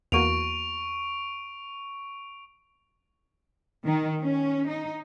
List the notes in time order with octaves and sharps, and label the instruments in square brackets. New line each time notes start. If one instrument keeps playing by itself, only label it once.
[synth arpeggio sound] E2 A#3 F#4 [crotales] C#6 D7 F7
[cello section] D#3
C#4
D#4